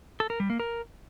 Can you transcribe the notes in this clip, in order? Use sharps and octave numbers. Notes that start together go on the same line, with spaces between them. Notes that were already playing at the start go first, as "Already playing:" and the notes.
A4
A#4
G3
A#3
A#4